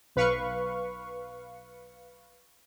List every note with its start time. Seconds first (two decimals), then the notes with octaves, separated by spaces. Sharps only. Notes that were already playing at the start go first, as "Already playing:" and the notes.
0.16 B1 B4 F5 C#6